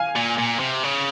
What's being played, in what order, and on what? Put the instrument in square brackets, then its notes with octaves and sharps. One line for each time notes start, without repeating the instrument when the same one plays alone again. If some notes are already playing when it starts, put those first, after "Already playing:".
Already playing: [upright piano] F5 G#5
[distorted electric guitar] A#2
A#2
C3
C#3